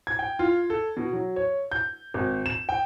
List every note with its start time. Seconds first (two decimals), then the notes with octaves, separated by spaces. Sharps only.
0.07 G#6
0.19 G5
0.39 F4
0.70 A4
0.97 B2
1.13 F#3
1.36 C#5
1.72 G6
2.14 G#1
2.46 E7
2.69 G5